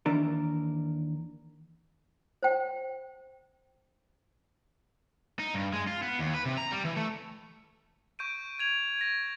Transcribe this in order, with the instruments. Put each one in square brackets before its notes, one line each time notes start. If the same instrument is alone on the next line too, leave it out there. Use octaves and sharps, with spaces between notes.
[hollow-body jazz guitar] D#2 E3 D4 A#4
[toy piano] C5 G5
[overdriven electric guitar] D#4
G2
G#3
F4
B3
D#2
B4
C3
A#5
G3
E3
A3
[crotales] C#6 G6 D7 D#7
G6 G#6 F7
A#6